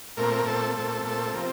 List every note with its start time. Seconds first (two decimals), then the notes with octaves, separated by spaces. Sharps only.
0.17 A#2 A3 C4 A#4
0.45 A#2 A3 C4 A4
0.75 A#2 A3 C4
1.03 A#2 A3 C4
1.33 C3 F3 C4 A#4